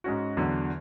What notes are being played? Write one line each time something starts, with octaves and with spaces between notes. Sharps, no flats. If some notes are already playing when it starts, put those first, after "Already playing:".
G#2 G#3 C#4 F#4
E2 D3 F#3